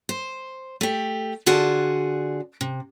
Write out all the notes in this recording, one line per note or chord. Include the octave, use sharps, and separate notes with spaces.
C5
A3 G4
D3 F4 F#4 G#4 D5 A5
C3